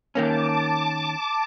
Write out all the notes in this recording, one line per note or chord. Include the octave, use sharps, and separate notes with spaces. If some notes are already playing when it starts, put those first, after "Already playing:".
D#3 A#3 C#4 A5 D6